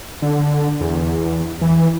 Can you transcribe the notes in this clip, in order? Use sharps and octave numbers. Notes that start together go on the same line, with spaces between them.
D3
E2
E3